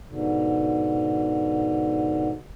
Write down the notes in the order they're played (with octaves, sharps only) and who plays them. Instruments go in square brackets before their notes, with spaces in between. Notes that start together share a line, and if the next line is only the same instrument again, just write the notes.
[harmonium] G#2 B2 D3